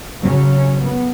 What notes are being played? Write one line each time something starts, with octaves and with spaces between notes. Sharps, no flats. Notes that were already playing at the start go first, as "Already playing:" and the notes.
C#3 F#3 C#4
B3